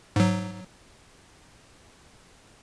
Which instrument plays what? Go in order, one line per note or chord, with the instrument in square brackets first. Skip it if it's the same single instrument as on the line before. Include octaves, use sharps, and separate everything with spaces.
[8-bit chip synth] G#2 F#3